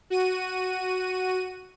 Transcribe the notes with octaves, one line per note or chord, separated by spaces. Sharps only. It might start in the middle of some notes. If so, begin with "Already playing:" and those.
F#4 D#7